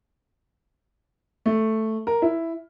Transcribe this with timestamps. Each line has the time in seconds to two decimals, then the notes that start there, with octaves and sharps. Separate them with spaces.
1.46 A3
2.07 A#4
2.22 E4